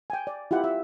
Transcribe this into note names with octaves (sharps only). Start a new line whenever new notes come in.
G5 G#5
D5
E4 F4 G4 F#5 G5
E5